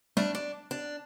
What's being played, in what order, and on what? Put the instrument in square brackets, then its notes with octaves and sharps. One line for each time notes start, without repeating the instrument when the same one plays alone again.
[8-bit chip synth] G3 A3 [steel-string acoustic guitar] D4
[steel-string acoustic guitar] D4
D4